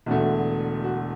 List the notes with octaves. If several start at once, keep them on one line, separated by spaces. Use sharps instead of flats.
E1 E2 D3 A3 F#4
F#4